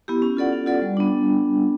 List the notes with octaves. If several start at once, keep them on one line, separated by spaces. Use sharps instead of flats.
B3 E4 G4
C#4
F4 A4 D5 F#5
C#4
F4 A4 D5 F#5
G3
B3 D4